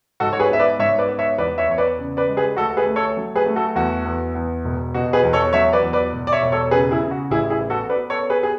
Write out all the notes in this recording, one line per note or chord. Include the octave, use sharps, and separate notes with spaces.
G#2 F#4 A4
C#5
G#4 B4
B3 E5
B4 D5
G#2 C#5 E5
B4 D5
B3
C#5 E5
E2 B4 D5
C#5 E5
E2 C#5
B4 D5
C#3
B4 D5
G#3
G#4 B4
D2 F#4 A4
G#4 B4
A3
A4 C#5
F#3
G#4 B4
A3
F#4 A4
E2 F#4
E2
E2
E1
B2 F#4
G#4 B4
E2
A4 C#5
F#3 C#5 E5
B4 D5
E2
B4 D5
E1
D5
C#5 E5
E1
A4 C#5
C#3 G#4 B4
E4 G#4
C#3
F#4
A1 E4 G#4
E4 G#4
B3
F#4 A4
B3 B4 D5
A4 C#5
B3
G#4 B4
G#4